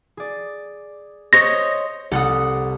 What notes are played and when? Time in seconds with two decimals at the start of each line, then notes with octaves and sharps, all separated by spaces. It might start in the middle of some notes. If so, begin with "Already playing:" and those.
0.17 G#4 D5
1.33 C5 C#5 D#5 A#6
2.12 C2 A4 F#5 D#6